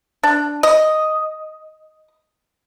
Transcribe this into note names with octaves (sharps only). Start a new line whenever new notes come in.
D4
D#5